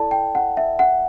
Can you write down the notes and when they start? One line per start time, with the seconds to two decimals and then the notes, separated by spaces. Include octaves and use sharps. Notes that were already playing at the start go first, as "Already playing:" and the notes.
Already playing: E4 A4 D5 A5
0.11 G5
0.35 F#5
0.57 E5
0.79 F#5